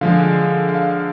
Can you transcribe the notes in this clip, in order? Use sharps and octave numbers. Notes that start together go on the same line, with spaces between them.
D3 F3 G#3 F5
F5